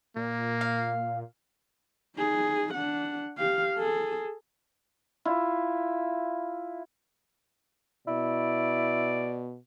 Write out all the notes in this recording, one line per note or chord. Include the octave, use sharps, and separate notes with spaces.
A#2 A#3
F5
D#4 G#4
D4 F#5
G4 F5
G#4 A4
E4 F4
B2 E4 D5